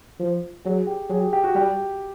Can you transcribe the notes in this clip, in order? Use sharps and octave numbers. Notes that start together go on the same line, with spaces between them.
F3
F#3 G#4
G4
F#3 G#4
G4
G4
F#4
G3 G4